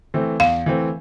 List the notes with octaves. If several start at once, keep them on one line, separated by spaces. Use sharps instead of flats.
E3 A3 C4
E2 F5
E3 A3 C4